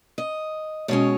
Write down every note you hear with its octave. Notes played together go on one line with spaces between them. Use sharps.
D#5
B2 G#3 C#4 C#5